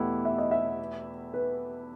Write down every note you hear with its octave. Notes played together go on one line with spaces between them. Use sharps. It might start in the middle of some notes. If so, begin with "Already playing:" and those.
Already playing: E2 B2 A3 E4 G4 F#5
E5
D#5
E5
B4